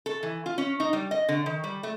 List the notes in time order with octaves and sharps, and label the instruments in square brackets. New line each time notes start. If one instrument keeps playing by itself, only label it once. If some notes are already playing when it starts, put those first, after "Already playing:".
[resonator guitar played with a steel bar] A4
E3
F4
C#4
D#4
G3
D#5
D3
D#3
G3
A3